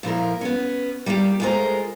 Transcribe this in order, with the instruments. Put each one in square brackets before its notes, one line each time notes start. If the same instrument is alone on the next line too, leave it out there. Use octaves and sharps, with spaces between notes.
[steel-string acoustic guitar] A#2 F3 E4 A#4
B3 C#4
G3 A#3 B3 F4 G4
G#3 A3 F4 G4 A#4 C5